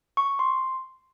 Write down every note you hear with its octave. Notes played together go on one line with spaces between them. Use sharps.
C#6
C6